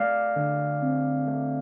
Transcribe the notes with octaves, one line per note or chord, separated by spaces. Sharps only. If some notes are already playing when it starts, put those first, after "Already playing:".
Already playing: A3 D5 F5
D3
C4
A3